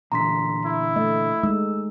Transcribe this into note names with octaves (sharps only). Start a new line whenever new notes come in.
A#2 D3 E3 A#5 C6 B6
E4
A3 D#5
G#3 A3 D#4 E6